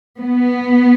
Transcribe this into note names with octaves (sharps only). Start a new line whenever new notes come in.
B3